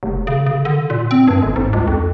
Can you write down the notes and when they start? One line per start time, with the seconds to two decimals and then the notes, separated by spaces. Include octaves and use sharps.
0.03 F1
0.27 C#3
0.46 C#3
0.65 D3
0.90 A#2
1.11 C4
1.28 G2
1.42 G1
1.56 G#2
1.73 C#2
1.88 F2